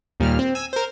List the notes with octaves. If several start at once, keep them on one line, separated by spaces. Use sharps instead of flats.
D#2 A#2 G3 F6
C4
G#5 E6
A#4 C5